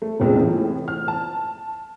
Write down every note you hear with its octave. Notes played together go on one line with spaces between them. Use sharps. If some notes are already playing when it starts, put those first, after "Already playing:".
A3
F1 A#1 C#3 G#3
A2 C3 E3
F6
A5